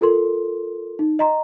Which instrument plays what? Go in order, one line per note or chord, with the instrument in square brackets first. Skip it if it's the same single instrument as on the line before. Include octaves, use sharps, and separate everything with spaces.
[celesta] F4 A4 A#4 C6
D#4
D#5 A#5 C6